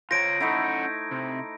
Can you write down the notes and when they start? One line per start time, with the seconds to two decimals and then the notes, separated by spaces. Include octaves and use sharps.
0.11 F4 C5 C#5 A#5 A#6 D7
0.40 A3 C#4 D#4 E4 A4 F#5
1.11 C3